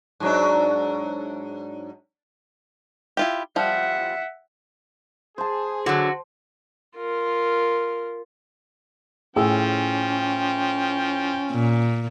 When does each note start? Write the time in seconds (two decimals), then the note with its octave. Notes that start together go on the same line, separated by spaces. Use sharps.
0.20 G#2 F#3 D4
3.17 E4 F4 G4
3.56 F3 G3 E5 F#5
5.38 G#4 C5 A5
5.86 D3 F#3 F#4
6.96 F4 A#4
9.36 A2 F3 C#4 G#4 G5 E6
11.51 A#2